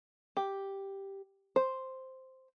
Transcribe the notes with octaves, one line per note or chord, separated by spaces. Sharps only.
G4
C5